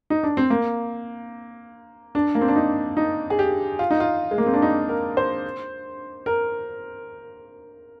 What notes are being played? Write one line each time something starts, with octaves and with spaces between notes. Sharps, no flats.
D#4
D4
C4
A#3
D4
A#3
C4
D4
D#4
D#4
G#4
G4
F4
D#4
F4
G#3
A#3
C4
D4
D#4
A#4
C5
A#4